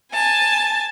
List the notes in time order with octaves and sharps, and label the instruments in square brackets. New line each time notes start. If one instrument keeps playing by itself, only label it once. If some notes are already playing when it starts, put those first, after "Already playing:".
[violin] G#5 A5